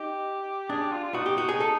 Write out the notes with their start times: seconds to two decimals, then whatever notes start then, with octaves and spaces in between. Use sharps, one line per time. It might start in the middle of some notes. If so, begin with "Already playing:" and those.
Already playing: D#4 G4
0.69 D4 G#4
0.81 G4
0.92 F4
1.04 F4
1.14 D#4 F#4
1.26 G4
1.38 F#4
1.49 G#4
1.60 A4